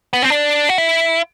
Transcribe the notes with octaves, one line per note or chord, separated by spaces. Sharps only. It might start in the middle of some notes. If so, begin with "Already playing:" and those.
B3
C4
D4
F#4
E4